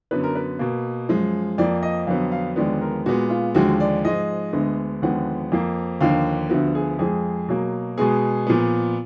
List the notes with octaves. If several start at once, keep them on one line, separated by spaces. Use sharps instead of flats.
F#2 D3 F#3 B3 B4
A#4
B4
B2 A#3
F#2 F3 G#3
F2 F3 A#3 D5
D#5
F2 D3 F#3 B3 F5
F5
D#2 D3 F3 G#3 B3 D5
A#4
A#2 G#3 B3 F#4
F4
D#2 D3 F3 G#3 F#4
D5
G#2 F3 G#3 D#5
D2 D3 G#3 B3
D#2 D3 F3 G#3 B3 F#5
F2 F3 A#3
D#2 D3 F3 A#3 F5
D2 D3 F3 B3 F#4
G#4
F2 F3 G#3 G#4
B2 F#3 A#3
B2 G#3 B3 G#4
A#2 F3 B3